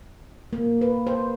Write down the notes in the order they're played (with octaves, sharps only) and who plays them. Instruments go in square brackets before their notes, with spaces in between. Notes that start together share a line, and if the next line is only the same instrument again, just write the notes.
[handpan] A#3
B4
C5